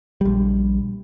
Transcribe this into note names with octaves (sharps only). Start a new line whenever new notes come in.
A#1 G3